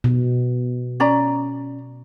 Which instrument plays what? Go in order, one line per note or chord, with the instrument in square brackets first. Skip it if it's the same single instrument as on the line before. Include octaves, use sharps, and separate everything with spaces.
[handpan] B2
[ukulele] C#4 D5 A#5